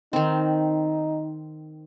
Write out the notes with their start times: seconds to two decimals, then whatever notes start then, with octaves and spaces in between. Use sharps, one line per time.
0.13 D#3 C4 D#4